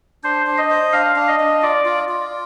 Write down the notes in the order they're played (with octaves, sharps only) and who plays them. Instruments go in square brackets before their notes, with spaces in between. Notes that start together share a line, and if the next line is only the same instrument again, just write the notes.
[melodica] D4 [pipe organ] C5
[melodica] D4
[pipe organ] D#5
[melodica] C5
[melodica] D4 [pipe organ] F5
[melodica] D4
[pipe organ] D#5
[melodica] D4
[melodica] F4 [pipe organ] D5
[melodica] F4
F4